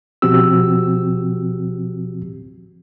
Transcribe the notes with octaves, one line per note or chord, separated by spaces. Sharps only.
B2 F3 C4 F#4 G4 E6